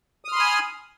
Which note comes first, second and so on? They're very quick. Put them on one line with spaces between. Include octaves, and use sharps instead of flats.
D#6 F6 C6 B5 G#5